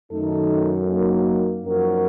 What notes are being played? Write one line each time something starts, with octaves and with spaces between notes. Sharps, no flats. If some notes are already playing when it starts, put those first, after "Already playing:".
F#2 D#3 A3 D#4 A4
F#3 A#3 D#4 A#4
F#2 F3 A#3 D#4 F#4 A#4